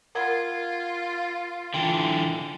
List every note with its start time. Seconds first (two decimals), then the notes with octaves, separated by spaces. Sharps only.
0.15 F4 A#4 F#5 G#6
1.74 D3 E3 F4 G5 C6